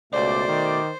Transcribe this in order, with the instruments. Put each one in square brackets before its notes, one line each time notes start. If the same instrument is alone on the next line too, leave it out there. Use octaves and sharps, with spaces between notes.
[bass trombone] C#2 [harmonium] B2 A3 [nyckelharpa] C5 [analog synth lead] D5
[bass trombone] D#3